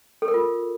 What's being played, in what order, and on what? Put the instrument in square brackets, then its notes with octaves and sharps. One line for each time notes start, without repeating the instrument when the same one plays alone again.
[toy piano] A4
A#4
F4